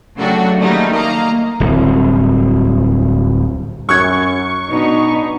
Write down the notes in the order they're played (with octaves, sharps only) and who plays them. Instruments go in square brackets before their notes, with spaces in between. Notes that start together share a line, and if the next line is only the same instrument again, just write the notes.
[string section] C#3 F#3 A3 D4 F#4 G4
D#3 G3 A3 A#3 D#4
A#3 D#5 F5 A#5
[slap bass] D1 C2
[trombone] F#2 [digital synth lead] C#6 [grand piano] F6 F#6 G#6
[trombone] B2 [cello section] B3 D4 D#4